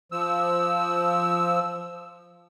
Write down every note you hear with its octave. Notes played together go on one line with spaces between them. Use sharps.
F3 E6